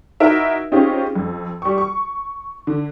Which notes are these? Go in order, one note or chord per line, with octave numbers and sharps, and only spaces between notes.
D#4 E4 F#4 A#4 E5
C4 C#4 D#4 F4 G4 G#4
F2
G3 C#6
C#6
D3